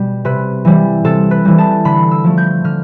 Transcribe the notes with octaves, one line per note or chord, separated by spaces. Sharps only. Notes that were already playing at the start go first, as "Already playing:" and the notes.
Already playing: B2 G3
C3 B4
E3 G3
C3 A4
B4
E3 G3
A5
D3 B5
E6
F3 A3
G6
D3 F6